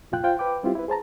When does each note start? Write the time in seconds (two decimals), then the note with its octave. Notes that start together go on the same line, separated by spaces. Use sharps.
0.12 C2 F2 A#2 F4 G5 F#6
0.23 F4 C5 F5 G5
0.39 B4 G5 D6
0.63 G3 C4 E4 F4 G4
0.75 E4 B4
0.88 G#4 C5 A5 A#5